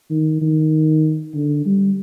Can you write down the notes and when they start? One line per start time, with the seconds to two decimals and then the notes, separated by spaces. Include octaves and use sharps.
0.10 D#3
0.41 D#3
1.34 D3
1.66 G3